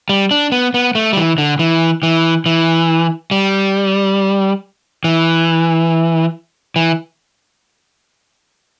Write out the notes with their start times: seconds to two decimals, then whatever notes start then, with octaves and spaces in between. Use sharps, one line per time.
0.09 G3
0.31 D4
0.52 B3
0.74 B3
0.95 A3
1.13 G3
1.17 E3
1.38 D3
1.59 E3
2.03 E3
2.46 E3
3.31 G3
5.04 E3
6.76 E3